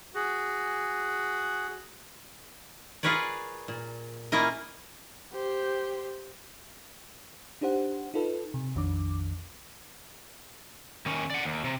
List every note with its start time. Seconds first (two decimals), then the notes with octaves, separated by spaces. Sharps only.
0.15 F#4 G#4
3.03 F4 G#4 A#4 B4 C#5 D5
3.68 A#2
4.32 A#3 C#4 E4 F4 A#4 D#5
5.33 G4 C5
7.61 D4 D#4 G4 C5 F#5
8.14 D#4 F4 A4 B4
8.54 C3
8.75 A#1 F2 D#3 D4 D6
11.06 D#3 C#4
11.30 D5 F#5
11.45 D#2
11.64 C3